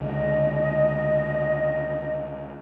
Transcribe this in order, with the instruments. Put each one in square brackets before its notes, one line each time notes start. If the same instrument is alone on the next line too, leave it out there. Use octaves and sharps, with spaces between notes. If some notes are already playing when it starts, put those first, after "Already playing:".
[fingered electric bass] C#2 D3 G#3 [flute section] D#5